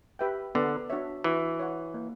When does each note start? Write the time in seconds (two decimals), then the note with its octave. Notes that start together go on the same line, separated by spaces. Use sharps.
0.19 G4 B4 E5 G5
0.55 D3 B3
0.90 D4 F#4 C#5 E5
1.24 E3 F#4
1.60 C#5 F#5
1.94 A#3